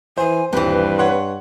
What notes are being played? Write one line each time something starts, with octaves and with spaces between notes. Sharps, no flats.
E3 C5 G#5
D#1 G2 E3 C4 B4
C#5 F#5 C6